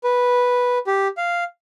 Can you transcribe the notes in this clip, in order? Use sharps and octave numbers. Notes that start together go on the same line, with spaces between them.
B4
G4
F5